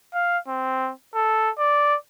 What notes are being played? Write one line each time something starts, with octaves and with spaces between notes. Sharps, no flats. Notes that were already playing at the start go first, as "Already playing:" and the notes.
F5
C4
A4
D5